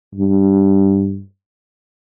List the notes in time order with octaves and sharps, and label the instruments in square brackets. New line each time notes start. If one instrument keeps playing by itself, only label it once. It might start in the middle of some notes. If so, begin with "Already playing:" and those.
[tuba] G2